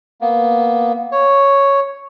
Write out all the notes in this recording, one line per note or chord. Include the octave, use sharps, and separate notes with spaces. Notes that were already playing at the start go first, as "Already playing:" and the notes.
A#3 B3
C#5